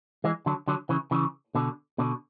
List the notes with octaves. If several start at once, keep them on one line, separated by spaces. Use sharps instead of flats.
E3 G#3
D3 F#3
D3 F#3
C#3 E3
C#3 E3
B2 D3
B2 D3